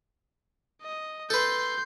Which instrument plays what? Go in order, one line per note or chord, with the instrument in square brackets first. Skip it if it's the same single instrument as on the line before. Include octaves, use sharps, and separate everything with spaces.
[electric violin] D#5
[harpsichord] A4 B4 [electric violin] C6 G6